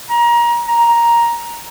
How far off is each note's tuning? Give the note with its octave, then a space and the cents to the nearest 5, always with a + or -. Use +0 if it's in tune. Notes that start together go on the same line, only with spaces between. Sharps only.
A#5 +25
A#5 +5